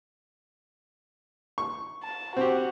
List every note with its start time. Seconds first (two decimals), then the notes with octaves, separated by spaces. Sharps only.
1.58 C#6
2.04 A5
2.37 C4 F#4 G4